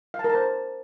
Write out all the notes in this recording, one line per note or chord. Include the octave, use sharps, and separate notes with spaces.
F5
A5
A#4
A5
C5